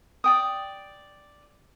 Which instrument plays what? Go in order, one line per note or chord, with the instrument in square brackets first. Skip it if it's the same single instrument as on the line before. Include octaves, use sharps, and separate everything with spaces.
[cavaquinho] D5 G5 D#6